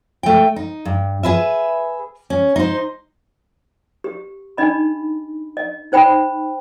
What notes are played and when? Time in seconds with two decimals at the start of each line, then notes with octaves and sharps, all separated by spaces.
0.23 A3 G5
0.56 D#4
0.85 G2
1.23 G#4 B4 E5
2.30 C#4
2.56 D#4 C5
4.04 G4
4.57 D4 D#4 D#5 B5
5.57 D#5
5.92 D#4 C5 G5 B5